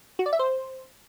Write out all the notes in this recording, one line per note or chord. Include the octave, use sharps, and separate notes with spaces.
F#4
D5
E5
C5